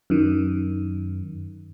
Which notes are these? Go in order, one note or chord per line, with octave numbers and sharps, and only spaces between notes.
F#2 D#3